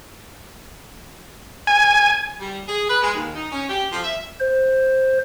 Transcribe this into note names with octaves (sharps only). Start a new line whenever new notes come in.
G#5
G3
G#4
B4
G#3
D#2
D#4
C#4
G4
F3
E5
C5